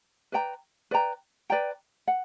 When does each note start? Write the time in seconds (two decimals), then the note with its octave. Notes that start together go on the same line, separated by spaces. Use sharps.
0.32 B4 D5 G5 A#5
0.91 B4 D5 G5 A#5
1.50 B4 D5 G5 A#5
2.08 F#5